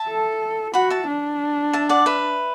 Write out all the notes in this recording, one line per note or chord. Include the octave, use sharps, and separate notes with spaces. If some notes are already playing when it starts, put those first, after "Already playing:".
Already playing: E5 A5
A4
F#4 F#5 B5
E5 A5
D4
E5 A5
D5 F#5
B4 E5